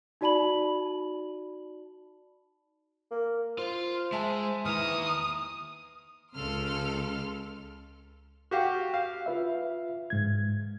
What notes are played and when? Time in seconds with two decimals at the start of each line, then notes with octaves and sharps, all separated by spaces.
0.21 D#4 F#4 D5 A5 B5 F#7
3.11 A#3
3.58 F4 C5
4.12 G#3 E5 G#5 A5
4.65 D#2 E3 A#5 D#6 F6
6.34 C#2 C#3 A4 C6 F6
8.51 F#4 G4 F5
8.94 F5
9.26 F4 B4 E5
10.10 G#2 G#6